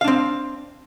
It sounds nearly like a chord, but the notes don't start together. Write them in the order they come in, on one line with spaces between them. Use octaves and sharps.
F5 D4 C4